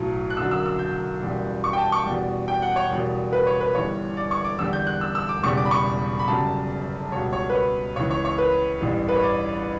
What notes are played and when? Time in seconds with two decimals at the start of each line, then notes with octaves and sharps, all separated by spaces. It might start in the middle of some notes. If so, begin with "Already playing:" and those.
Already playing: B1 A2 F#3
0.30 F#6
0.37 F#1 F#2 D3 F#3 E6
0.51 E6
0.66 E6
0.79 G6
1.22 F#1 E2 B2 G3
1.64 C#6
1.73 G5
1.78 A5
1.92 C#6
2.06 E2 B2 G3
2.48 G5
2.62 F#5
2.76 C#5
2.90 F#1 E2 B2 G3
3.33 B4
3.47 C#5
3.61 B4
3.75 G1 G2 E3 G3 C#5
4.17 D5
4.31 C#6
4.44 D6
4.59 E2 D3 G3 E6
4.73 G6
4.87 F#6
5.01 E6
5.15 E6
5.29 D6
5.43 E1 E2 C#3 G3 C#6
5.57 D6
5.65 B5
5.71 C#6
6.19 B5
6.27 G1 F#2 C#3 G3 A5
7.12 C#2 B2 G3 C#5
7.33 C#5
7.50 B4
7.55 C#5
7.96 C#2 C#3 E3 C#5
8.10 C#5
8.25 C#5
8.38 B4
8.81 A1 G2 E3 G3
9.09 B4
9.15 C#5
9.23 D5